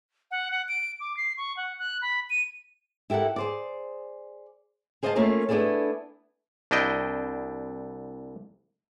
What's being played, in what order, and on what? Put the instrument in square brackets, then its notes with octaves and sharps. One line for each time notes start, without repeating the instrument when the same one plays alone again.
[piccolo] F#5
F#5
D7
D6
C7
C#6
F#5
F#6
B5
D#7
[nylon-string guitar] E4 G4 A4 A#4 F#5
G#4 C5 D5
G#4 C5 D#5 F5 G5 A5
A3 A#3 C#4 F4 A#4
A3 B3 D4 E4 G#4 A4
[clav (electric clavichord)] C2 D4 E4 D#5 G5